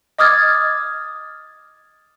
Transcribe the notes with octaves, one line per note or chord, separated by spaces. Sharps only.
D#5 D6 D#6 F6 G#6 A6